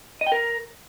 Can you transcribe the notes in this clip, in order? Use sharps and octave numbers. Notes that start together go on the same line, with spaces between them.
D#5
G5
A#4